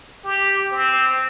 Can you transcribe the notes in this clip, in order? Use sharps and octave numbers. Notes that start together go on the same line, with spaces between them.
G4
C4